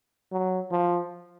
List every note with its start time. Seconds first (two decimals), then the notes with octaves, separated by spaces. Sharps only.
0.32 F#3
0.71 F3